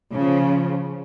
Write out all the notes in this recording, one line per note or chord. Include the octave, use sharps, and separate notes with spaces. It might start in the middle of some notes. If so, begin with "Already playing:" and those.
C#3 F3